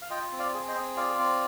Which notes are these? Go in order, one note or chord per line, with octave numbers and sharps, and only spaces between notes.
F5
F4 D#5 G5
C4
D5 F5
G#4
C5 D#5
C4
F4 D5 F5
C4